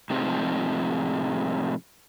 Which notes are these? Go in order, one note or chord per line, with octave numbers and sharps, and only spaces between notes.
A2 C3 F3 G#3 C4 D#4